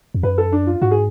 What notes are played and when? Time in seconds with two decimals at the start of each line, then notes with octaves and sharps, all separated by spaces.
0.14 F2
0.23 F#2 B4
0.38 A4
0.52 D4
0.67 F4
0.82 G#2 F#4
0.91 G#4